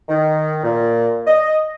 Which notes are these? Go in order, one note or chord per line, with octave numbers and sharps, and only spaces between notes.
D#3
A#2
D#5